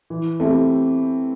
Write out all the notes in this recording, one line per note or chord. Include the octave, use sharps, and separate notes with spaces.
E3
A3 C4 E4 G4